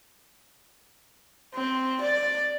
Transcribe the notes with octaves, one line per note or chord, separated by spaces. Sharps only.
C4
D5